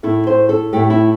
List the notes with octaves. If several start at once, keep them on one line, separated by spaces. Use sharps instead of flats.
A2 A3 E4
C5
A4
A2 A3 G4
E4